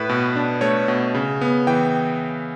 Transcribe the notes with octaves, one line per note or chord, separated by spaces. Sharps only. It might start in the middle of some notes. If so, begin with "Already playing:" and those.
Already playing: A2 B4
B2
D4
A3 C#5
B2
C#3
B3
E3 G5